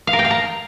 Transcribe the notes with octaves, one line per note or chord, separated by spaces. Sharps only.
F5
A#4
G5
F5
A#5